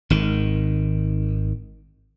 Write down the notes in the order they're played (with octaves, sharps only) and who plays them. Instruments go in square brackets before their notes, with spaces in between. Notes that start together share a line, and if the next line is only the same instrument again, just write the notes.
[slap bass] G#1 D#3